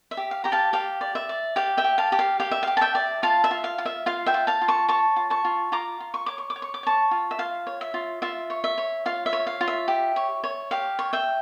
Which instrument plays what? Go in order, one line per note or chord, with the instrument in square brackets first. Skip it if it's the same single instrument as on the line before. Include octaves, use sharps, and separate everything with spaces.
[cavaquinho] E5
G4
F5
G4 A#5
F5 A5
G4 F5
D5
E5
D5
G4 F5
E5 G5
G4
F5 A5
G4
F5
G4 F5
E5
G4 F5
A5
E5 G5
D5
F4 F5 A5
E5
F4
F5
F4
E5
F4 F5
E5 G5
F4
F5 A5
F4
A5 C#6
C#5 A5 C#6
F4
A5 C#6
F4
F4 A#5 D6
F4
C#6
C#5 D6
C#6
D6
C#5
C#6
D6
C#5 A5 C#6
F4
E5
F4 F5
C#5
E5
F4
F4 E5
C#5
E5
C#5
F4 F5
E5
C#5
F5
F4
E5
G4
C#5
C#5
G4 F5
C#5
E5 G5